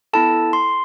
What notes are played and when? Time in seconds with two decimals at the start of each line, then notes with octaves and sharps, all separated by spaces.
0.13 B3 E4 A4 A5
0.53 C6